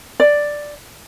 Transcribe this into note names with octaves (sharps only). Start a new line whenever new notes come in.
D5